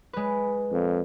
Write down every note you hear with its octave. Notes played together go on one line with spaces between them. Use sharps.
G#3 B4
F2